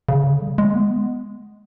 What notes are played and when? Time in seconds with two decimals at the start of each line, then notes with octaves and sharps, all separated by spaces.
0.09 C#3
0.25 D3
0.42 G3
0.58 G#3
0.75 B3